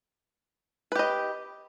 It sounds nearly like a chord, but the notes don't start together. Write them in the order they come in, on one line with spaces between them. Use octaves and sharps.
B4 G4 D#5